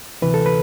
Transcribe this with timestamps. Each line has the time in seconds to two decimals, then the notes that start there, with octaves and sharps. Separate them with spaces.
0.22 D2 C3 E3 B4
0.34 A4
0.46 B4